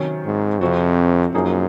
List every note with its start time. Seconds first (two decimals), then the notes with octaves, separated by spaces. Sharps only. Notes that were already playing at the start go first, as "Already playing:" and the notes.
Already playing: C3 D#3 F#3 C#4
0.25 G#2
0.61 F2 C3 F3 C4 F#4
1.34 F#2 F3 A#3 D#4 G#4